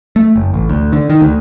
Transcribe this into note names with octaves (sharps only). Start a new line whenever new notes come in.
A3
F#1
A1
D2
D3
D#3
D2